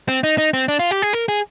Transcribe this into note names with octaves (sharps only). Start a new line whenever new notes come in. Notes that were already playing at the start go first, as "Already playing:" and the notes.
C4
D#4
D#4
C4
D4
F4
G4
G#4
A#4
G#4